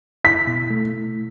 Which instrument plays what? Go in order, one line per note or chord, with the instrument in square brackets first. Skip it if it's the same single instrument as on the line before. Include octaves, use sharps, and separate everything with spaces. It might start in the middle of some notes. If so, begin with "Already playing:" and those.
[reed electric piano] E4 [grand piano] B6
[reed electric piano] B2
A3